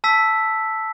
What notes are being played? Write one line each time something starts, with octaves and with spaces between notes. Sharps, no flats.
A5 E6 B6